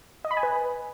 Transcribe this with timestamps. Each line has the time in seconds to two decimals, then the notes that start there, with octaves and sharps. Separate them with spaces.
0.25 D#5
0.31 B5
0.37 G#5
0.43 B4